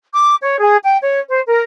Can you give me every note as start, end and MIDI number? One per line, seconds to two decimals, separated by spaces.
0.13 0.36 86
0.41 0.57 73
0.59 0.77 68
0.84 0.97 79
1.01 1.20 73
1.30 1.41 72
1.47 1.63 70